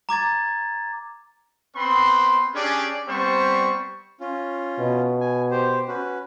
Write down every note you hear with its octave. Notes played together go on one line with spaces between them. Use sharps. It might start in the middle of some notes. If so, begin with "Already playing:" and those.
A#5 D6 G#6 A6
B3 C4 B5 C6
C#4 D4 G4 G#4 D5
G3 B3 C4 C5 C#6
C#4 F4
B2
G#5
G4 C5
C#4 F#4 B4